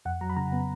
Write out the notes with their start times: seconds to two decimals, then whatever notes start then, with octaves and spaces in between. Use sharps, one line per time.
0.05 F2 F#5
0.21 F#3 A#5
0.30 B5
0.37 C#3 A#5
0.52 B3